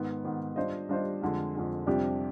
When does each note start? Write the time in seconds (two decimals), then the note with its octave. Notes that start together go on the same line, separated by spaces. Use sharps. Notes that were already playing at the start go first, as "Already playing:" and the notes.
Already playing: G#2 D#3 B3
0.25 G#2 D#3 B3
0.56 G3 D4 F4 C5 D#5
0.89 G3 D4 F4 C5 D#5
1.22 F2 D3 G#3
1.55 F2 D3 G#3
1.87 F2 C3 G3 D4 G4